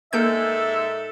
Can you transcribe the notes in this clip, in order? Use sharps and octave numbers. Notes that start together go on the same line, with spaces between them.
G#2 G#3 A#3 A4 A#4 E5 G6